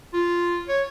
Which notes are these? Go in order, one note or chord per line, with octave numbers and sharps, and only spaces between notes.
F4
C#5